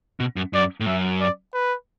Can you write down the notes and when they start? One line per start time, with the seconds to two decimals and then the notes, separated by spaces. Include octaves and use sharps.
0.20 B2
0.36 F#2
0.53 F#2 D5
0.80 A2
0.86 F#2 E5
1.21 D5
1.54 B4